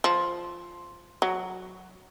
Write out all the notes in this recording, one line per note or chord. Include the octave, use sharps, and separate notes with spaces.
F3
F#3